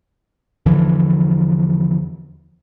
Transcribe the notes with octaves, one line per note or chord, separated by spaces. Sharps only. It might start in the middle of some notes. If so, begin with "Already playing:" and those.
E2 D3 E3 F3